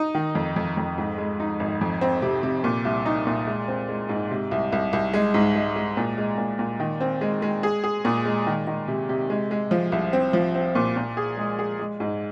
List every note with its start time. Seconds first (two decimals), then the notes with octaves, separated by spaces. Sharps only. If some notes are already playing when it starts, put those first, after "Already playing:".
Already playing: D#4
0.15 D#3
0.35 F2
0.56 F2
0.77 F2
0.98 G#2
1.18 G#3
1.40 D#4
1.60 G#1
1.81 F2
2.01 C4
2.22 C3
2.43 C3
2.64 A#2
2.85 C2
3.06 D#4
3.27 A#2
3.47 G#3
3.68 C4
3.89 G#3
4.09 G#2
4.31 C3
4.51 C2
4.72 C2
4.93 C2
5.14 G#3
5.34 G#2
5.55 G#3
5.76 G#3
5.97 A#2
6.18 G#3
6.38 A#2
6.59 A#2
6.80 D#3
7.00 C4
7.21 G#3
7.42 G#3
7.63 G#4
7.84 G#4
8.05 A#2
8.25 G#3
8.47 D#3
8.67 D#3
8.88 C3
9.09 C3
9.30 G#3
9.51 G#3
9.71 F3
9.92 C2
10.13 C4
10.33 F3
10.55 C4
10.75 A#2
10.96 A#2
11.17 G#4
11.37 G#3
11.59 G#4
11.79 G#3
12.00 G#2